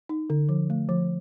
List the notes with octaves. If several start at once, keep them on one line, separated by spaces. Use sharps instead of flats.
D#4
D3
F3
A3
F3